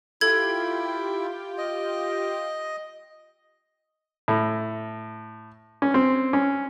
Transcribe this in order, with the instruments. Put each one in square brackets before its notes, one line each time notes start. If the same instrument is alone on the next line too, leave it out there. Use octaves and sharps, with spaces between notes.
[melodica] E4 [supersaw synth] F4 G4 G5 [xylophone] A4 G#6
[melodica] D#5
[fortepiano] A2
C#4
C4
C#4